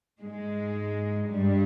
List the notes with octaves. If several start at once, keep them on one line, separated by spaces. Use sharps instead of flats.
G#2 G#3
G2 G3